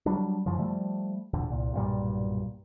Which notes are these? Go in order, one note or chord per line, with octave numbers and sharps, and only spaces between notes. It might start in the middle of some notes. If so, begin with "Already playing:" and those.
F#3 G3 D4
F#2 C#3 E3 F3
F3 G3 A3
E1 A#1 E2 D3
C2 A#2
B1 G2 A#2 G3